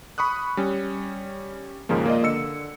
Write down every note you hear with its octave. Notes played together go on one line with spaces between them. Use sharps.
B5 C#6 D#6 F#6
G3 C#4
D#2 G#2 C#3 F3 A#3
A#3 F4 D5 D#5
D3 E6 C#7